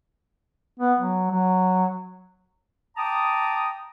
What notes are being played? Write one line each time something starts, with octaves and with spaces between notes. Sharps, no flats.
B3
F#3
F#3
G5 A5 A#5 D6 D#6